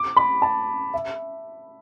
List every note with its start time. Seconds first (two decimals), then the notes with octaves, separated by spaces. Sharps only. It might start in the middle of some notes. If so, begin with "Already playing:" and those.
Already playing: D6
0.16 B5
0.42 A5
0.94 E5